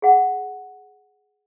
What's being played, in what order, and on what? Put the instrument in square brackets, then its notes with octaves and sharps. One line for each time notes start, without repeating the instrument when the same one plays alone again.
[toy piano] G#4 F#5